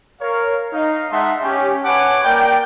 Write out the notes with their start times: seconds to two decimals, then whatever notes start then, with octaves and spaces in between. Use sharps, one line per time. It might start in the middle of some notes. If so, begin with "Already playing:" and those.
0.21 A#4 C#5 F5
0.73 D#4 F5
1.11 G#3 D#4 E5 F#5 A5 C6
1.42 C#4 G4
1.84 B4 C#5 F#5 G#5 A5 D6
2.24 A#3 A#4 D5 G5